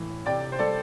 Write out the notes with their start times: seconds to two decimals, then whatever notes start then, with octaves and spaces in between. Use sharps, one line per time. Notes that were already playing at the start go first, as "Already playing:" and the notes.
Already playing: A2 E3
0.26 C3 D5 G5
0.52 C5
0.59 G3 A4 D5